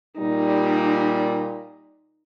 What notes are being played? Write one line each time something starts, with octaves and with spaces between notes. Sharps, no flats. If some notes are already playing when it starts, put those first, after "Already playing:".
A#2 G3 D#4